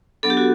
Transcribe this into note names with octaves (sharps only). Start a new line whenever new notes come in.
F#3 B3 D4 A4
G4
F#4